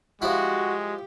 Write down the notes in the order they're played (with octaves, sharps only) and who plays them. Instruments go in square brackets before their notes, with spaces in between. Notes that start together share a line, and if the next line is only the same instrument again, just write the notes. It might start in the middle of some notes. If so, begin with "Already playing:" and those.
[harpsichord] F3 E4 [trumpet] G#3 [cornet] F#4 [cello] G4